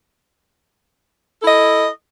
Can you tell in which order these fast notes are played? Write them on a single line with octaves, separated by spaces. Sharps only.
A4 E4 D#5